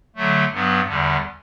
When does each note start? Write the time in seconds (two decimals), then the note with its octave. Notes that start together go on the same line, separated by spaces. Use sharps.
0.16 D3 F#3 A3
0.52 G2 F#3 B3
0.88 E2 D3 G3